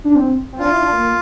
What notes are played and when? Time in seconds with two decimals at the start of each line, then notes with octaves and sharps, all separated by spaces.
0.04 D4
0.15 C4
0.52 C4
0.59 D4 F4
0.71 E4
0.81 D4
0.92 A#3